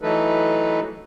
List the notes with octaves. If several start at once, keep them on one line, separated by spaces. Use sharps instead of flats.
E3 F#3 A3 D#4 A4 B4